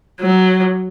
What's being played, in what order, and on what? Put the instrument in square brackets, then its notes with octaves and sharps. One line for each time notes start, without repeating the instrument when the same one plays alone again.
[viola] F#3